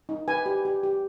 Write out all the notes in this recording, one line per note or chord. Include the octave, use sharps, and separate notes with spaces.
D#4
B4 G#5
G4
G4
G4